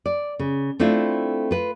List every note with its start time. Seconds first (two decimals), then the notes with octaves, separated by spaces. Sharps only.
0.06 D5
0.39 C#3
0.79 A3 C4 D4 E4 F4
1.51 F4 B4